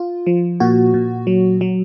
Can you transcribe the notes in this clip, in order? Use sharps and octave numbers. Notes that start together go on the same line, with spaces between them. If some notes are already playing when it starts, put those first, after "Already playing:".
Already playing: F4
F3
A#2 F#4
A#2
F#3
F#3